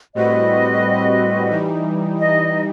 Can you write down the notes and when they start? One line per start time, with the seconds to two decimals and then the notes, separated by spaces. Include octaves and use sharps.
0.14 A2 G3 C4 F#4 B4 D#5
1.50 E3 G3 D#4
2.17 D#5